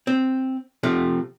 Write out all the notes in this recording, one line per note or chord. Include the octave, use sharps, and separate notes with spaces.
C4
C3 F3 A3